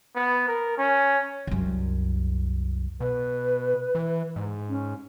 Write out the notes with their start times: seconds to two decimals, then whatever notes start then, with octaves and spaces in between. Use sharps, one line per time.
0.15 B3
0.48 A#4
0.77 C#4
1.47 C2 F#2
3.00 B2 B4
3.95 E3
4.36 G#2
4.69 C#4